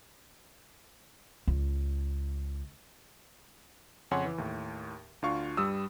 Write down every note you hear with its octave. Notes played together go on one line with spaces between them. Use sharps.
C#2
F2 C#3 C#5 F#5 G#5 C6
E3
D#2 A2
D2 D4 F4 F5 C#6
G2 G3 D#6 E6